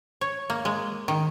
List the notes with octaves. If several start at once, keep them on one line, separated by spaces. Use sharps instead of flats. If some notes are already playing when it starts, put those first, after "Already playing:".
C#5
A#3
G#3
D#3